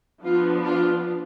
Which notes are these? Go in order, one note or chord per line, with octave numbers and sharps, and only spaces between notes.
F3 B3 D4 F4
F4